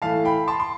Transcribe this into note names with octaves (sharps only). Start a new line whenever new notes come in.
A2 E3 A3 F5 A5
G5 B5
A5 C6
C6